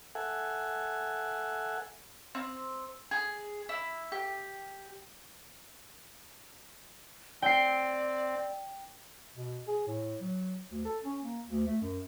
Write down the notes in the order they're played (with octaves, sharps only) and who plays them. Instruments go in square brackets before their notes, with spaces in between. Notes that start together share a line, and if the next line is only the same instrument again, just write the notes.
[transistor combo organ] A4 E5 F#5 G#5
[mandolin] C4
G#4
E4
G4
[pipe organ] C4 [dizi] D5 [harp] G5 C7
[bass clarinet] B2
G#4
A2
F#3
D2
A4
C#4
A#3
D2
A3
F#2